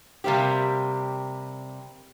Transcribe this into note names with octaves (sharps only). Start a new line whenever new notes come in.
C3 G3 A#3 C4 G4